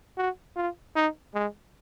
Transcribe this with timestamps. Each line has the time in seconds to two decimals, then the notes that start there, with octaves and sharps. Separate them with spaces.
0.17 F#4
0.56 F4
0.95 D#4
1.34 G#3